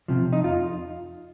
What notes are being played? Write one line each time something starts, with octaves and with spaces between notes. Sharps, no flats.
C3 F3
D#4
F2 F4